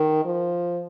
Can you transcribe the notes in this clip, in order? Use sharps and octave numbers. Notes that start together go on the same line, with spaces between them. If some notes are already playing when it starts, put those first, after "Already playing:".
Already playing: D#3
F3